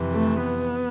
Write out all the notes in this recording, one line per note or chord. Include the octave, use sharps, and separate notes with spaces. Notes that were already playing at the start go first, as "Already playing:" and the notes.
Already playing: F2 C3 E3
A3
B3